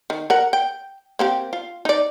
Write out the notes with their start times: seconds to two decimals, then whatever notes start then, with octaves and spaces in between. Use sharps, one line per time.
0.10 D#3
0.30 A#4 F#5
0.53 G5
1.19 A#3 C4 G4
1.53 F4
1.85 D#4 D5